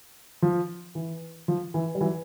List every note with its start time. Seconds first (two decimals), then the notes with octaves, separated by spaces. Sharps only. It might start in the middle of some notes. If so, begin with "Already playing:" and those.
0.42 F3
0.95 E3
1.48 F3
1.74 E3
1.95 G3
2.01 E3 F#3